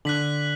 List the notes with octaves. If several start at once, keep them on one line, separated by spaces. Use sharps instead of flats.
D3 F#6 B6 F#7